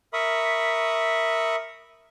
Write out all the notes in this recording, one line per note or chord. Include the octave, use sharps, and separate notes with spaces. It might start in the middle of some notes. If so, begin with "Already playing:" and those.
A#4 E5 B5 C#6 D#6